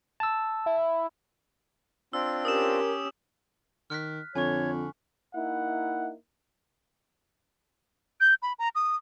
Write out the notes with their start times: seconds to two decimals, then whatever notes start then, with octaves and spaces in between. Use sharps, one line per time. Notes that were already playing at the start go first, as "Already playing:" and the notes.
0.20 A5 E6
0.66 E4
2.13 C4 D4 F4 E6
2.45 C#4 G4 A#4 D#6 E6 E7
3.90 D#3 F6 F#6 B6
4.36 F2 D3 C#5 G#5 C#6
5.34 A#3 D#4 E4 F#5
8.21 G6
8.42 B5
8.59 A#5
8.75 D#6